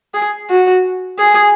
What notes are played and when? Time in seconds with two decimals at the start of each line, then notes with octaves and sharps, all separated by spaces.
0.14 G#4
0.50 F#4
1.18 G#4